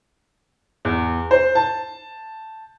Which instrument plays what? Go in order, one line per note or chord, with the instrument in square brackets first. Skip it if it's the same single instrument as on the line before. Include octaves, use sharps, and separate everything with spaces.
[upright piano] E2
C5
A5